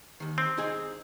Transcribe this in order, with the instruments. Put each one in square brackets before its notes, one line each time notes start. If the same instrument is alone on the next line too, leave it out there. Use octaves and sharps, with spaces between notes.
[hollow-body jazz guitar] D#2 D#3
[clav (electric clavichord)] C4
[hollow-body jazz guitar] D#4 G#4 G#5